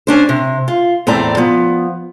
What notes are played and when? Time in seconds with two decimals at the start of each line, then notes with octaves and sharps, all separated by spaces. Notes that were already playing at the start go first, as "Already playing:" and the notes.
0.07 C#4 D4 C5
0.29 C3
0.68 F4
1.07 E2 A2 C4 D5 A#5
1.37 F3 B3